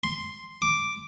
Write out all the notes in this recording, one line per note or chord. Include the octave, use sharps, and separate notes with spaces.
C6
D6